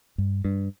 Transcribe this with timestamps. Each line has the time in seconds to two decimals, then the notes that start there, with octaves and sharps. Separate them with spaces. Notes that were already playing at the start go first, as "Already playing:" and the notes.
0.18 G2
0.45 G2